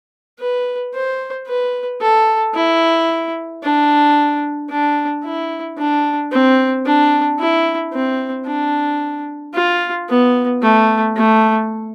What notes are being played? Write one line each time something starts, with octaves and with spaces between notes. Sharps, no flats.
B4
C5
B4
A4
E4
D4
D4
E4
D4
C4
D4
E4
C4
D4
F4
B3
A3
A3